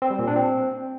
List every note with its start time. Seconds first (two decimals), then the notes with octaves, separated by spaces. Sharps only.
0.02 C4
0.10 G3
0.19 A#2
0.28 D4
0.36 C4